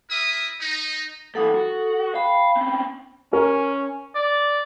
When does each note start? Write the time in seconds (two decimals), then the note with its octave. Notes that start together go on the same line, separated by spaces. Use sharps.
0.10 E4 A#4 E5 D#6
0.60 D#4
1.35 G2 E3 A4 F#5 D#6
1.55 F#4
2.15 F5 G5 B5
2.57 C4 C#4
3.33 C#4 A#4
4.15 D5